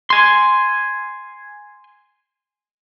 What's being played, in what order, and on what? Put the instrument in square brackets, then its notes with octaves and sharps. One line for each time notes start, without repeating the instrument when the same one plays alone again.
[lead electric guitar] G#5 C6